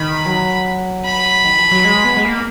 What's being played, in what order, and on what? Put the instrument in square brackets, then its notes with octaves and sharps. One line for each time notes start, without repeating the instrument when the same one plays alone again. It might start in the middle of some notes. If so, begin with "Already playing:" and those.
Already playing: [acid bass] D#3 [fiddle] B5
[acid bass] F#3
[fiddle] B5
[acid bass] D#3
F3
F#3
G#3
B3
G#3
A#3